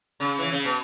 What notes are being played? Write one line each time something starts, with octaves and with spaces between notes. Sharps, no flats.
C#3
E3
C#3
B2